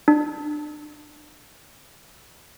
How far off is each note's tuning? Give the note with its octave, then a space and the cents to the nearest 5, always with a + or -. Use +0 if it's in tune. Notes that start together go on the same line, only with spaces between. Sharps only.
D4 +30